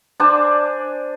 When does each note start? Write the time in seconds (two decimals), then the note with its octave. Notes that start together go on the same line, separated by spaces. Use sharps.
0.20 D4 C5 D5 G#5